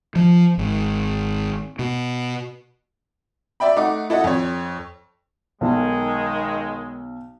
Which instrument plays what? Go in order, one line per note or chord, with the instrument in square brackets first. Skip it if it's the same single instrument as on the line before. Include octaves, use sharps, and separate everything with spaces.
[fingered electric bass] F3
G#1
B2
[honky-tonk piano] D5 E5 G5 B5
A3 D#4 F#5 D6
E4 A4 D#5 F#5
F2 C#5
[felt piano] B1 [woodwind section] D#3 G#3